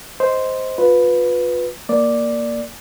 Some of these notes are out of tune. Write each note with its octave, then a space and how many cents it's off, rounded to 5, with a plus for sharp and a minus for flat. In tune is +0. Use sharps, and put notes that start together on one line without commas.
C5 -5 D#5 +10
F4 +30 B4 +0
A#3 +0 D5 +0